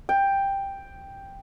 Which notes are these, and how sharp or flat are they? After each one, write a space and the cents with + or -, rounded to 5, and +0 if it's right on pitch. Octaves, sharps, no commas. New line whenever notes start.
G5 +5